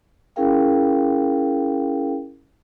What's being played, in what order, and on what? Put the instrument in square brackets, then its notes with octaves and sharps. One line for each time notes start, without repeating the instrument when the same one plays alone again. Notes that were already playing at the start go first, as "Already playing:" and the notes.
[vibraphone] C#4 E4 G#4 A#4 F5 G5